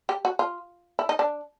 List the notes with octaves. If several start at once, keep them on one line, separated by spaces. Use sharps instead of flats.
G4
F#4
F4
E4
D#4
D4